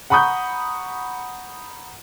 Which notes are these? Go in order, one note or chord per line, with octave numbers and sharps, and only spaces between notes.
F#5 A#5 B5 C#6 D#6 G6